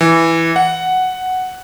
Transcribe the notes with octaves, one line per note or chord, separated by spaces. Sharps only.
E3
F#5